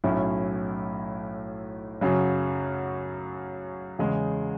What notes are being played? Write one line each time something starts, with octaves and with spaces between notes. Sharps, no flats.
B1 A2 F#3 C#4 E4
F#2 C#3 F#3
E2 C#3 G#3